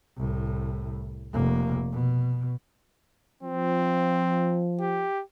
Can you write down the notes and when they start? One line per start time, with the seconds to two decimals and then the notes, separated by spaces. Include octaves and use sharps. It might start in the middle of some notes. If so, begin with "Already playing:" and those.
0.17 C2 A2
1.33 F1 A#3
1.92 B2
3.43 F3 C4
4.80 G4